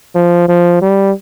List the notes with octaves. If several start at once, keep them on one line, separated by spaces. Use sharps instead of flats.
F3
F3
G3